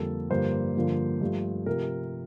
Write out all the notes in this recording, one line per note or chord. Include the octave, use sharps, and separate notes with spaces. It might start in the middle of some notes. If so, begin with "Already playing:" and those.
Already playing: F2 D3 G3 A#3 A4
G2 D3 F3 A#3 C5
G2 D3 F3 A#3
G2 F3 A3
C3 F3 A3 A#4